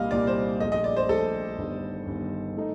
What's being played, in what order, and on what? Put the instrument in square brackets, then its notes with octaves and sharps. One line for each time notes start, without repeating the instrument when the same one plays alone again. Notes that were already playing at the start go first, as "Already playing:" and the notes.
Already playing: [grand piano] C2 A#2 G3 A#3 [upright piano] D#5 F5
[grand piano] C2 A#2 G3 A#3 [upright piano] D5
[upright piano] C5
[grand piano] A#1 A#2 A3 [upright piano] D#5
[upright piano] D#5
D5
C5
[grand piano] A#1 A#2 A3 [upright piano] A4
[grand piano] G1 G2 D#3
G1 G2 D#3
D#3 A3 D#4